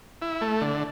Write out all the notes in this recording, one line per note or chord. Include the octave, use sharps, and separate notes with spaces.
E4
A3
D3